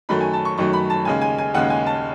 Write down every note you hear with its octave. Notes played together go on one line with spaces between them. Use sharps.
F#2 D#3 F#3 A3 B5
G#5
A5
C#6
F#2 D#3 F#3 A3 C#6
B5
A5
D#2 C#3 G#3 G#5
G#5
G#5
D#2 C#3 G#3 F#5
G#5
A5